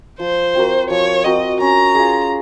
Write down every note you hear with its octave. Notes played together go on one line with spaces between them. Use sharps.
F3 C5
C4 F#4 A#4
F3 C#5
C4 F#4 A#4 D#5
C#4 A#5
F4 G#4